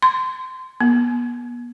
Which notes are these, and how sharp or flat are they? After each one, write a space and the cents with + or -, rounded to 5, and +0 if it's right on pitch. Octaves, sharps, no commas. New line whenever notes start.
C6 -20
B3 -40